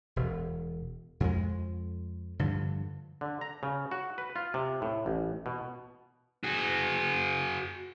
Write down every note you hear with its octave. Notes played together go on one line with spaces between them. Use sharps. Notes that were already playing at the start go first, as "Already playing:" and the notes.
E1 B2
F2 G#3
G2 D3 F3
D3
A#5
C#3
F#4
B4
F4
C3
A2
A1
B2
F#4 G#4